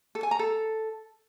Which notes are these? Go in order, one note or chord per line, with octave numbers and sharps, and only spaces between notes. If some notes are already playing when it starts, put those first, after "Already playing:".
A4
G#5
A#5
A4